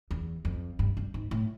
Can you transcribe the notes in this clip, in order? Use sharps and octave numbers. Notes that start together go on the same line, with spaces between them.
E2
F2
G2
G2
G#2
A2